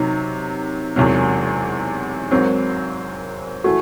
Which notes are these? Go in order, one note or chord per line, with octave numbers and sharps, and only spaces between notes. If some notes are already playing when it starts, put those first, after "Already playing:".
Already playing: C3 D#3 F#3 D#4
E1 E2 C3 F#3
G#1 G#2 D#3 F#3 C4
E3 A3 F#4